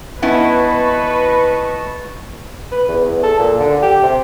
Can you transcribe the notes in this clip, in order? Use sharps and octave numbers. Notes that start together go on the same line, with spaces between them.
B3 C#4 E4 B4 D#5 A5 C#6
B4
E2
E2
A4
A#2
D3
G4
C3